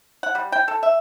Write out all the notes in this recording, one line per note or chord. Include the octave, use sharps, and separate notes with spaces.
F#5
G3
G5
A4
E5